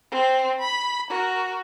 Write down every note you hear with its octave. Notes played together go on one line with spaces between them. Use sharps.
C4 C5
B5
F#4 A#4